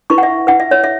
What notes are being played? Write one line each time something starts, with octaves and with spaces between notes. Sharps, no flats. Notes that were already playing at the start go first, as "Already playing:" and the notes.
E4 B4 C#6
F#5
E5
E4 B4 F#5
E5
C#5
E5